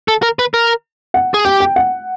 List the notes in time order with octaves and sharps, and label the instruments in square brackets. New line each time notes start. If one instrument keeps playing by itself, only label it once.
[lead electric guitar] A4
A#4
B4
A#4
[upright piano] F#5
[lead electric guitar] G#4
[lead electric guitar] G4 [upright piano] G5
[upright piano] G5
F#5